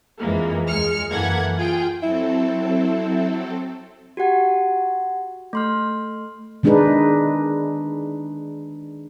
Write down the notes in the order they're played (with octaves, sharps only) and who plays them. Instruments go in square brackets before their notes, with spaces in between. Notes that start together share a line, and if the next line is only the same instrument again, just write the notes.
[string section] F2 E3 G#3 A#3
D#2 G#3 F6 C#7
F#2 E3 A#3 A4 F#5 G#6
F4 G#4 G5
[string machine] F#3 C4 A4 [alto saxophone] E4
[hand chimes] F#4 G4 F#5 G#6
A3 C6 F6
[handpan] D#3 G#3 D4 D#4 G#4 B4